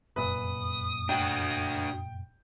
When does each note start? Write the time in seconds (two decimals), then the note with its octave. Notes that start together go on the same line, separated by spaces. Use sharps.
0.16 F1 F#2 A#2 B4 D#6
1.09 D4 F#4 G5